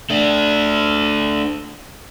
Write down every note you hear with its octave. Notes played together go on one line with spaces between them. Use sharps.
A3 D4